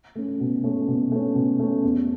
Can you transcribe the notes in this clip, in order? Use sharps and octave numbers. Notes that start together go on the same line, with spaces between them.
A3 C#4
B2
A3 C#4
B2
A3 C#4
B2
A3 C#4
E2